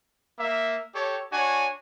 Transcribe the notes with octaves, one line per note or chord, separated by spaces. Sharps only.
A#3 E5
G4 A4 C#5
D4 F#4 C#5 G#5